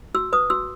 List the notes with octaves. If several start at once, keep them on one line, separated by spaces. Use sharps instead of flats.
F#4 E6
B4 D#6
F#4 E6